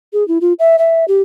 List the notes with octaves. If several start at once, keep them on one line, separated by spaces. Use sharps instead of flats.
G#4
E4
F4
E5
E5
G4